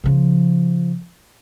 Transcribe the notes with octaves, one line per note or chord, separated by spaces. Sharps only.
C#3 F3